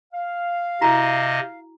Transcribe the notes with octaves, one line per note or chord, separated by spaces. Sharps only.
F5
C3 E4 F#4 D#5 A#5